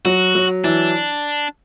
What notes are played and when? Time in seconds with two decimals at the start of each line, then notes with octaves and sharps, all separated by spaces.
0.05 F#3 F#4
0.35 F#3
0.64 E3 D4